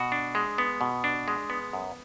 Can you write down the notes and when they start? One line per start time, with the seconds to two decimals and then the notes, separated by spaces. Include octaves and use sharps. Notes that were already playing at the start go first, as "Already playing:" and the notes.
Already playing: B2 F#4
0.12 D4
0.35 G#3
0.58 B3
0.81 B2
1.04 D4
1.28 G#3
1.50 B3
1.73 F#2